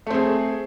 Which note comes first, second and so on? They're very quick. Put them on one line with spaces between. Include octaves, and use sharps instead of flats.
A3 C4 G#4